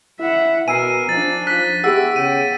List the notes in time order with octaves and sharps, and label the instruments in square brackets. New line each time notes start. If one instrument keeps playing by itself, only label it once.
[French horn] E4 [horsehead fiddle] E5 F#5
[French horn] B2 [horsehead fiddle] B3 A#4 [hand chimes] G#5 E6 C7 [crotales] D#7
[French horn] F3 [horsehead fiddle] D4 D#4 [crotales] A6
[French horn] F3 [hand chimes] F#6 [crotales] B6
[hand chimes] B3 G#4 F#5 [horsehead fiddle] E4 [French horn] G4 [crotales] E6
[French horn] C#3 [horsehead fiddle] G5 [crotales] D#7